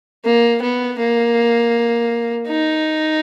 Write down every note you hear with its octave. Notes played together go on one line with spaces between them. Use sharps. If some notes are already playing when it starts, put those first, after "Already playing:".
A#3
B3
A#3
D#4